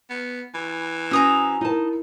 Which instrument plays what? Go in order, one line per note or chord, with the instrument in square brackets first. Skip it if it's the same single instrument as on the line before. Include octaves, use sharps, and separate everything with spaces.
[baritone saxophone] B3
E3
[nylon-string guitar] C#4 F#4 C5 [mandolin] A#5 D#6 E6
[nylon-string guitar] D#4 A5 [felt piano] E4 A#4